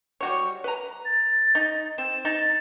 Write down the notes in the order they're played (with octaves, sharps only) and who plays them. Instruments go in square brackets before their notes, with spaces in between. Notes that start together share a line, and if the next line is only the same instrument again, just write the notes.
[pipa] G3 F#4 C#5
B4 A#5
[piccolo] A6
[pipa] D#4
[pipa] C4 [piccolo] E7
[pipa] D#4 [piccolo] A6